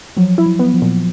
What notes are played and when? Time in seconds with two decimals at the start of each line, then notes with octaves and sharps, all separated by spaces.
0.17 F3 F#3
0.38 E4
0.46 F#3
0.59 B3
0.74 F3
0.82 A#2